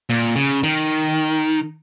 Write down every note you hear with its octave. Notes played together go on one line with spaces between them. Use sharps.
A#2
C#3
D#3